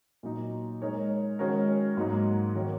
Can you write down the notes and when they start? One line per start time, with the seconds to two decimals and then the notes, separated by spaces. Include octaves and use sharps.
0.23 A#2 F#3 D#4
0.82 G#3 D#4 A#4 C#5
1.39 D#3 G#3 C#4 F#4 A#4
1.97 G#2 F#3 A#3 D#4
2.55 D#3 A#3 F#4 C#5